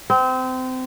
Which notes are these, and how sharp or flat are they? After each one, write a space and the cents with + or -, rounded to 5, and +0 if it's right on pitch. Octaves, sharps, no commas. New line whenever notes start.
C4 -25